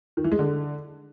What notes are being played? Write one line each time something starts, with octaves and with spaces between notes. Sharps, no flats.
D#3
E3
G#3
D3